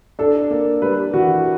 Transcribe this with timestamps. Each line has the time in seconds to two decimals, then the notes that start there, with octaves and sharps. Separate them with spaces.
0.19 D4 A4
0.51 A#3
0.82 G3 B4
1.13 E3 F#4